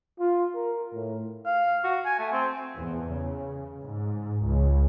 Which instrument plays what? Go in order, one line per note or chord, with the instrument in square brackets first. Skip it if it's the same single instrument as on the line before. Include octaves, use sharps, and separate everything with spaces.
[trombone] F4
A#4
A2
[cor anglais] F5
F#4
G#5
A3
C4
[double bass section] E2
C#3
G#2
C#2